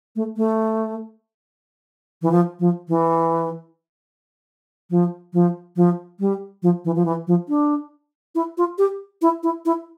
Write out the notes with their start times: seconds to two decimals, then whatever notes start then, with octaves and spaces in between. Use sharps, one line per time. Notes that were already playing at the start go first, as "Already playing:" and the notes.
0.16 A3
0.37 A3
2.22 E3
2.32 F3
2.60 F3
2.89 E3
4.90 F3
5.33 F3
5.76 F3
6.20 G3
6.63 F3
6.85 E3
6.96 F3
7.06 E3
7.27 F3
7.49 D4
8.35 E4
8.58 F4
8.78 G4
9.22 E4
9.43 E4
9.65 E4